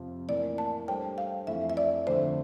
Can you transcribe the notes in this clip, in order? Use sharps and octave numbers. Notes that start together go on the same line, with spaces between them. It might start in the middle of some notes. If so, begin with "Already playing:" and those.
Already playing: F2 C3 F3
A2 E3 A#3 D5
A5
G3 D4 A4 C5 G5
F5
F2 E3 A3 E4 E5
E5
D5
F2 D3 A3 C5